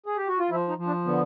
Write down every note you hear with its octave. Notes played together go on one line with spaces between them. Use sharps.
G#4
G4
F#4
F4
F3 E4
D#4
F3
D4
D3 B3